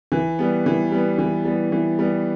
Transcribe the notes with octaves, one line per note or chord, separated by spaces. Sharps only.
E3
G3 B3
E3
G3 B3
E3
G3 B3
E3
G3 B3